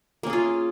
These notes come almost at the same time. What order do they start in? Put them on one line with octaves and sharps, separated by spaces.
A#3 C#4 G#4 F4